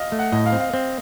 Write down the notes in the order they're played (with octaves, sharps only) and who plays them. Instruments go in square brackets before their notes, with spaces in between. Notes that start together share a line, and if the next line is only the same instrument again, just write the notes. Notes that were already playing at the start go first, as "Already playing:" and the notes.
Already playing: [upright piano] D#5 F5
[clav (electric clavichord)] A3
[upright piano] F#5
[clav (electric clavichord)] A2 [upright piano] D#5
[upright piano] F5
[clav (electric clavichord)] C4
[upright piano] F5
[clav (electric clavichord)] C4